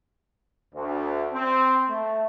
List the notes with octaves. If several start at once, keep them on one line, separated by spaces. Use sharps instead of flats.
D2
C4
A3